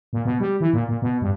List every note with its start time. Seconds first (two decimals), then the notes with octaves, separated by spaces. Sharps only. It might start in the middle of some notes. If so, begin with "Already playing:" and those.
0.13 A#2
0.25 B2
0.40 G3
0.61 E3
0.73 A#2
0.88 A#2
1.02 B2
1.22 G2